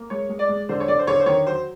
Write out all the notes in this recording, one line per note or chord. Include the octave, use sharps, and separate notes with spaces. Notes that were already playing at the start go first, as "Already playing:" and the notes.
Already playing: A#3
G#3 C#5
G#3
D5
G#3
D3 C5
C#5
D3 D5
C5
D3 C#5
C5
D#3 C#5
F#3 C5